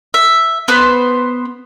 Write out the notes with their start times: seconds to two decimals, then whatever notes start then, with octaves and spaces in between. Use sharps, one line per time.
0.14 E5
0.68 B3 B4 C5